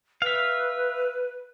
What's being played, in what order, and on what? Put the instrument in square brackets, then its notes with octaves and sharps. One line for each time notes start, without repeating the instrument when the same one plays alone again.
[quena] B4 [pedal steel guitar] E5 F5